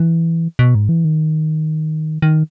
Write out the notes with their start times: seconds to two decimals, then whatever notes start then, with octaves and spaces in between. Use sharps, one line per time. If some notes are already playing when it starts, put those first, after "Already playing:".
Already playing: E3
0.59 B2
0.75 G#2
0.89 E3
1.05 D#3
2.22 D#3